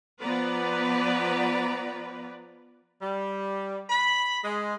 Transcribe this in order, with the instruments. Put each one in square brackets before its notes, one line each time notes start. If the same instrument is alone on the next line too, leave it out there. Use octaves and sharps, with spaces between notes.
[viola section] F3 B3 B4 D5 A#5
[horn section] G3
B5
G#3